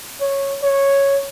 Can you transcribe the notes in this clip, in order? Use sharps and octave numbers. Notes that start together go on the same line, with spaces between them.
C#5
C#5